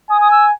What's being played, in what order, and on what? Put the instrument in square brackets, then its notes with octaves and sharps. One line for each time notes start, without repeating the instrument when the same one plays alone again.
[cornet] G#5 [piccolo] D#6
[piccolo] D#6
E6